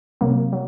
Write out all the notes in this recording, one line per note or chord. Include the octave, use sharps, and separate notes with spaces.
C3 F#3 A#3
F#3